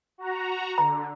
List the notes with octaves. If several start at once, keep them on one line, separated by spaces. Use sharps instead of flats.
F#4 A#5
D3 A#5